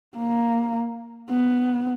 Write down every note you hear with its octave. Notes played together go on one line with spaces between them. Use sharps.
A#3
B3